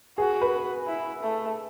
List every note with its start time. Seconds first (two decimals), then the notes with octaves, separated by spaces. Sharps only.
0.18 F#4 G#4
0.41 B4
0.88 E4
1.23 A3